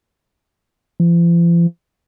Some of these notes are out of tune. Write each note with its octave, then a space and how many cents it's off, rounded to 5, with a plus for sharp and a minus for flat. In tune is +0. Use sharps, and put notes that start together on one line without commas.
F3 -45